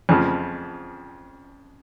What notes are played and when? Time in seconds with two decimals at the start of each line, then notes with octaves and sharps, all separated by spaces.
0.09 F2 C#3 F3